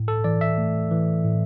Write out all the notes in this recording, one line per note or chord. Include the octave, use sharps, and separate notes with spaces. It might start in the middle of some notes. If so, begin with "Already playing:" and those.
Already playing: A2
A4
E3 D5
E5
A3
E3
A2